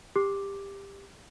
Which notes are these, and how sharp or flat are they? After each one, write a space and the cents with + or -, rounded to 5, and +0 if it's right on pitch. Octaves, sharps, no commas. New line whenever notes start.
G4 +20 D6 +0